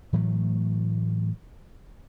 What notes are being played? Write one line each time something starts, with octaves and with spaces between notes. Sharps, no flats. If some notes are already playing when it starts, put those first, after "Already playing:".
A2 E3 F#3 A3